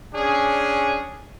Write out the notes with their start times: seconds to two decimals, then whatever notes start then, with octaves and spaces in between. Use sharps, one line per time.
0.14 C#4 D4 G#4